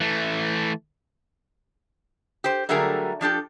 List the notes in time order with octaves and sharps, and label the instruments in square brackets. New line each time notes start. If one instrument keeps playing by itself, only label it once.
[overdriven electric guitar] E3 A3
[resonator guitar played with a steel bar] G4 C5
D3 F#3 G3 A3 G#4 A#4
F3 D4 G4 A4